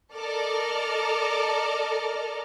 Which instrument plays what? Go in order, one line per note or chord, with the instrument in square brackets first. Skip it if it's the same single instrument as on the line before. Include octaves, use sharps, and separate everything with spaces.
[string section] A4 A#4 D5 D#5 F6